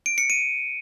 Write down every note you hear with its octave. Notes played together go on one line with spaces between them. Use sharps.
D7
C#7
D#7